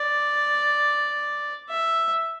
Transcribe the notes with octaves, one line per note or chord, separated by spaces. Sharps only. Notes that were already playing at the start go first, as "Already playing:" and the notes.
Already playing: D5
E5